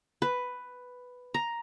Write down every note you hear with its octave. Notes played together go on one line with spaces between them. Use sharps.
B4
A#5